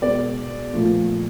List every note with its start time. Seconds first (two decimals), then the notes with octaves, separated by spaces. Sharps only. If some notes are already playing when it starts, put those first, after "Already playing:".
0.02 B2 G#3 D5
0.73 A#2 F3 A3